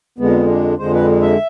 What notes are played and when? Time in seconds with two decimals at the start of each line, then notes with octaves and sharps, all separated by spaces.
0.18 F2 D3 G#3 B3
0.48 D4
0.78 F2 D3 G#3 C5
0.93 B4
1.22 E5